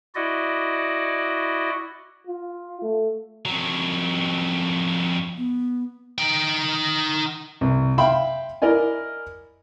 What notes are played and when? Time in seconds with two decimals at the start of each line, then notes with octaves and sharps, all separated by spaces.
0.15 E4 F#4 D5 D#5
2.27 F4
2.82 A3
3.45 F2 F#3
5.37 B3
6.18 D#4 G5
7.61 C2
7.98 E5 F5 G5 B5 C6
8.62 E4 A#4 D5 D#5 G#5